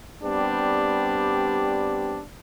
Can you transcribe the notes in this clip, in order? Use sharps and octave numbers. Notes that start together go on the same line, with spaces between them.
G3 B3 C4 D4 G4